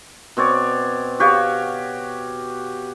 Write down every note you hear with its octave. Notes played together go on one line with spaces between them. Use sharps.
B2 C4 C#5 D5
F#4 G4 C#5 F5